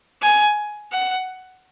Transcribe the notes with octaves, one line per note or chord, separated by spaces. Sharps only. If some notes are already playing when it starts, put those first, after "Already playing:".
G#5
F#5